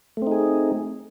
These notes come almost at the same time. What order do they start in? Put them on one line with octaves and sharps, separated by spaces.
A3 C4 D#4 G#4